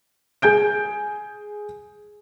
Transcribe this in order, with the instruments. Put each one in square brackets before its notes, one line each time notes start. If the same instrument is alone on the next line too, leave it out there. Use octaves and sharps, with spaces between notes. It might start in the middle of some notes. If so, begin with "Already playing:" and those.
[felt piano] G#4 G#5 G6 D7